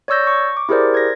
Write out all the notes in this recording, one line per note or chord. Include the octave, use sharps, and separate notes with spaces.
C#5 D5 C#6 E6 G6 A#6
C#6
D6
E4 G4 G#4 A#4 C5 D5
G#6 A#6